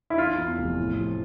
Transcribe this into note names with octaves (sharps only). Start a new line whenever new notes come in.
E4
E3 F4
E2
F1
A2
F3